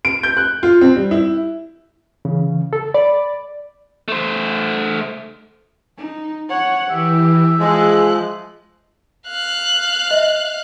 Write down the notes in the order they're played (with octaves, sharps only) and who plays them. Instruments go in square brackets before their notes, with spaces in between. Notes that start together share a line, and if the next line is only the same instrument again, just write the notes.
[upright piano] D7
G6
F#6
F4
C4
G3
E4
[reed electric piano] C#3 E3
A4
[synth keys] D5 [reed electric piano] B5
[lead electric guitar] A3 C5
[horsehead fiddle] D#4
C#5 F#5
[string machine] E3 [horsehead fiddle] G4 [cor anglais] E5
[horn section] F3 G#3 [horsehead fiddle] G#4 [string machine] F#6
[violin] F5 F#6
[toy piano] D#5 E5